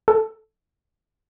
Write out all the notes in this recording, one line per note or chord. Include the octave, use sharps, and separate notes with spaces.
A4